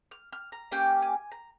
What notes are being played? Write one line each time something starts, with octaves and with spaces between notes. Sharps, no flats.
F6
F6
A#5
A#3 C#4 G4 G5
G#5
A#5